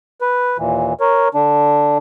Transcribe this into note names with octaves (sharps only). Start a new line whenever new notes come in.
B4
D#2 A#2 E3
A#4 C#5
D3 D4